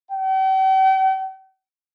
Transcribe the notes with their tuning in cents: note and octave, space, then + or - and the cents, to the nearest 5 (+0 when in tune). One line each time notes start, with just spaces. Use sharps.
G5 -45